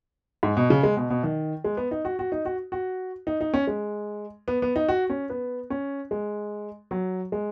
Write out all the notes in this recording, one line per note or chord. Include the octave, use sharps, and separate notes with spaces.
G#2
B2
C#3
G#3
B2
B2
D#3
G#3
B3
D#4
F#4
F#4
D#4
F#4
F#4
D#4
D#4
C#4
G#3
B3
B3
D#4
F#4
C#4
B3
C#4
G#3
F#3
G#3